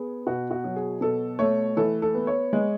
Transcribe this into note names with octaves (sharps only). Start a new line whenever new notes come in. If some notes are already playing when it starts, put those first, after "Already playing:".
Already playing: B3 G#4
B2 F#4
F#4
F#3
G#4
B2 A4
A3 C#5
E3 A4
A4
B3
C#5
G#3